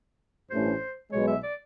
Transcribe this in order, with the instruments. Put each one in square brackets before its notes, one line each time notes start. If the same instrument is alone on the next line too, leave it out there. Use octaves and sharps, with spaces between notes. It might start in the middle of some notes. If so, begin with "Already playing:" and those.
[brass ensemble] A1 G2 E3 A3 C#4 [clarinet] C5
[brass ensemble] B1 B2 G#3 [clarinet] C#5
[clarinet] E5
D5